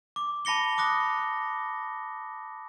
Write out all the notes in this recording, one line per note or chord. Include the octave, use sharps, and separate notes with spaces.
D6
A5 B5 A#6 C#7 G7
D6 D#6 F#6 A#6